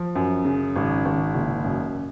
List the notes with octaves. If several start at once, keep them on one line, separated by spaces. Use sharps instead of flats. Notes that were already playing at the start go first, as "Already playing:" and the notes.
Already playing: F3
F#2
C#3
G#1
G#1
F#1
F#2